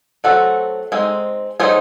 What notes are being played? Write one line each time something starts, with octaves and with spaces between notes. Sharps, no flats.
F#3 A3 C4 F#4 A4
G#3 C4 D#4
F#3 A3 D#4 G#4 C5